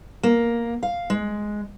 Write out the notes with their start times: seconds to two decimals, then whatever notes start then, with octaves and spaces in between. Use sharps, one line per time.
0.23 A#3
0.83 F5
1.10 G#3